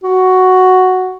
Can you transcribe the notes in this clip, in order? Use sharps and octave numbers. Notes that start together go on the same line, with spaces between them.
F#4